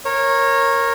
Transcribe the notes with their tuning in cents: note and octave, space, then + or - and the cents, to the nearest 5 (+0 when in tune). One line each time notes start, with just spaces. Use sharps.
A#4 +0 C#5 -20